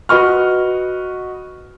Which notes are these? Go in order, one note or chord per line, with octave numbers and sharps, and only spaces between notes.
F#4 B4 D#5 C#6 F6